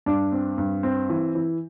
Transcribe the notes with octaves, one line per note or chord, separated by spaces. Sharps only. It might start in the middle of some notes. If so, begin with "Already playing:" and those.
G2 D4
C4
G2
C4
E3
E3